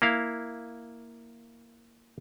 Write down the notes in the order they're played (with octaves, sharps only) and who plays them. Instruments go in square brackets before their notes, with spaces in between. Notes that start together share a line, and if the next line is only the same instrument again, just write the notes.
[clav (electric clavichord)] A#3 E4 F5